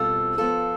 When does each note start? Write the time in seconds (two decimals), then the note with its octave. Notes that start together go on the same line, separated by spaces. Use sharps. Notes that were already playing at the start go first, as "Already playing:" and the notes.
Already playing: B2 G3 C4 F4 A4 E6
0.38 F3 B3 F4 A4